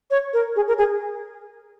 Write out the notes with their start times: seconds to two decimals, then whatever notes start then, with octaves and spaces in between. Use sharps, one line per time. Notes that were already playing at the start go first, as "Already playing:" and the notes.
0.11 C#5
0.33 A#4
0.56 G#4
0.68 A#4
0.78 G#4